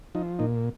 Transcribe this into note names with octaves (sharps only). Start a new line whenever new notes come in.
F3 D#4
A#2 D#4